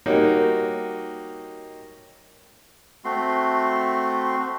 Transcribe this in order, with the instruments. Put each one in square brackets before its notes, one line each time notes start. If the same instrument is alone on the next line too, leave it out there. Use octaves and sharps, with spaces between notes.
[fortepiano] G3 A#3 D#4 F#4 C#5
[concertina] A3 C4 F#4 C6